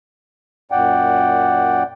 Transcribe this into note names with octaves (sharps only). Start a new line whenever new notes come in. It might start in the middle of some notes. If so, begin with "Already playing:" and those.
F#2 A#2 D5 F#5 G5